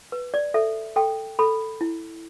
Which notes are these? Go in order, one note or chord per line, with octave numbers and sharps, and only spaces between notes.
B4
D5
A4 E5
A4 G5
A4 B5
E4